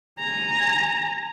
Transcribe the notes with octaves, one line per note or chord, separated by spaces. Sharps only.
G#5 A#5